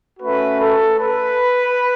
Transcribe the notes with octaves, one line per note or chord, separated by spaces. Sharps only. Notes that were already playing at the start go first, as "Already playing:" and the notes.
A3 C#4 F#4 B4
A4
B4